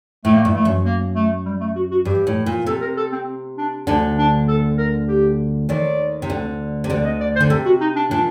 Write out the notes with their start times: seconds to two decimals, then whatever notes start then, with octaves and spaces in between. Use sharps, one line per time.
0.25 A2 A3
0.34 A#3
0.43 G2 A3
0.55 A3
0.65 F#2
0.85 A#3
1.15 A3
1.45 G3
1.60 A3
1.76 F#4
1.91 F#4
2.05 G2 G4
2.27 A2
2.46 A#2
2.66 C3 A4
2.81 A#4
2.97 A4
3.12 C4
3.58 D4
3.87 D2 D3 D4
4.18 D4
4.48 A4
4.78 A#4
5.08 G4
5.69 D#2 D#3 D5
6.22 C3
6.29 D2 D3
6.84 C3
6.90 D2 D3 D5
7.05 D#5
7.21 D5
7.36 C5
7.40 D3
7.50 C3 A4
7.66 F#4
7.81 D#4
7.96 D4
8.11 A#2 D4